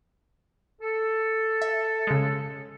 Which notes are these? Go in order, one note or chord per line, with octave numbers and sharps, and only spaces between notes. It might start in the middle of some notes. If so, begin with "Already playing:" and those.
A4
E5
C#3 G#3